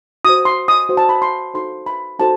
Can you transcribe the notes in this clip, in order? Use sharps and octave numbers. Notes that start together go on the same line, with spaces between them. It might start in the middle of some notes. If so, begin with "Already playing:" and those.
F#4 C5 D#6
C6
D#6
F#4 C5
A5
B5
C6
D#4 F#4 A4 C5 C6
B5
D#4 F#4 A4 C5 A5